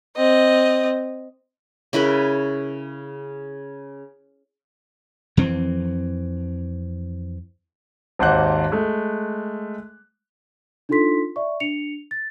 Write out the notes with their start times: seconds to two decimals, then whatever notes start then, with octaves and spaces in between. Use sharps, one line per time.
0.16 C4 D#5
1.93 C#3 E4 A#4 B4
5.37 F2 E3 C4
8.19 G#1 D#2 C5 D#5 F#5 F#6
8.72 G#3 A3
10.89 D4 D#4 F4 A4 C6 B6
11.36 D5 E5 C#6
11.60 D4 C#7 F7
12.11 A6